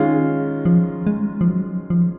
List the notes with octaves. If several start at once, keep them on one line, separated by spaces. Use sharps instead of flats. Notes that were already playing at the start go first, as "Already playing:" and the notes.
Already playing: D#3 G#3 C#4 F4
F3
G#3
F3
F#3
F3